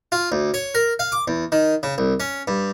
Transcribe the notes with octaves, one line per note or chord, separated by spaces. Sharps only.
F4
D2
C#5
A#4
F5
D6
E2
D#3
C#3
C2
C#4
G2